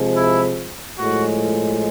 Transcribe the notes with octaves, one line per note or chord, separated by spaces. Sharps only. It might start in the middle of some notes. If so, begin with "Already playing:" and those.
Already playing: C3 F3 G#3
E4
A2 F3 G#3 F#4